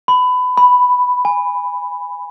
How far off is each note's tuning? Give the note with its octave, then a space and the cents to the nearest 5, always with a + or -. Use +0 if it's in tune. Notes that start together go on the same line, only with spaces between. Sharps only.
B5 +25
B5 +5
G#5 -20